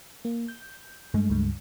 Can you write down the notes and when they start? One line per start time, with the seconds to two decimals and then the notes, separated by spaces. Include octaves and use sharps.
0.25 A#3
0.48 G6
1.14 G2 G#3 A3
1.30 C#2 G2